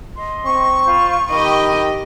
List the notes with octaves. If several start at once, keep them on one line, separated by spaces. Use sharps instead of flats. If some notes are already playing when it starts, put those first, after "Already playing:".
D#5 C6
C4 C#6
F4 C5 B5
D#3 G4 D#5 B5